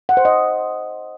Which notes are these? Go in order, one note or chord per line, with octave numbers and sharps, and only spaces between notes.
F#5
C5
D#5